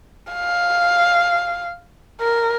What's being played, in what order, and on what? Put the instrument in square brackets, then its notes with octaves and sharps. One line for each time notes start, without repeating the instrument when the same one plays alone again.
[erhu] F5
A#4